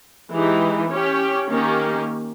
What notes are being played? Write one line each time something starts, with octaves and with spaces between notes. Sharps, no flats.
E3 G#3 D#4 G4
C#4 G4 C#5
D#3 A#3 C#4 G4